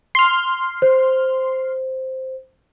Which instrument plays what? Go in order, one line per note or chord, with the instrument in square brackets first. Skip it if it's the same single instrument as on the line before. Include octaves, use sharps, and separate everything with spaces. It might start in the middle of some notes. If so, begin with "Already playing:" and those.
[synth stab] C6 F6
[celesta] C5